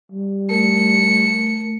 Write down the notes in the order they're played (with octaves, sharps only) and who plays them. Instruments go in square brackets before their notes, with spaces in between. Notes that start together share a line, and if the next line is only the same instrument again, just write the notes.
[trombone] G3
[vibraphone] A3 A#4 [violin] C#7